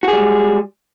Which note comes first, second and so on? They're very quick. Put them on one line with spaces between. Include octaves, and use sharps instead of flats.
F#4 G#4 G3 G#3